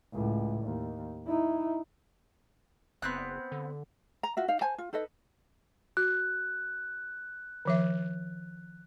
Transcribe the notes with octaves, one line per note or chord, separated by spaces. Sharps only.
C#2 A2
D#2
D#4 E4
F#1 B3 C4 F#6
D3
A#5
F4 F#4 E5
D#4 F5
C5 G#5 A5
F4
D#4 A4 B4 D#5
F#4 F#6
D#3 F3 E5